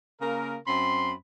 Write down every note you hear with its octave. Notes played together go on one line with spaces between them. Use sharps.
C#3 A#3 A#4
F#2 C4 B5 C6